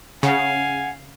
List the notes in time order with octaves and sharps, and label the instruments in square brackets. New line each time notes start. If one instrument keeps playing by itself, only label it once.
[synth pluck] C#3 [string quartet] F5 [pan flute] F#5 [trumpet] G#5